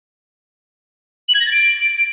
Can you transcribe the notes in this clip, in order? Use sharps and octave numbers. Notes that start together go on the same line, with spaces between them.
F#7
G#6
A#6
A6
D7